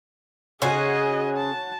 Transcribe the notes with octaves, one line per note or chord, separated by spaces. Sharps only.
C#3 F#4 G#4 C5 C#5 D#5 G#5
A5